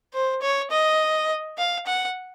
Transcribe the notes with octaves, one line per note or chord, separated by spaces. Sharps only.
C5
C#5
D#5
F5
F#5